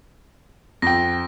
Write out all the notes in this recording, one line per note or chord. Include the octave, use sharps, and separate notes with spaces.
F2 G5 A#6